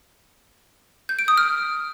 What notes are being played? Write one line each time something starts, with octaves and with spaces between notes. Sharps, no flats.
G6
D7
D#6
F6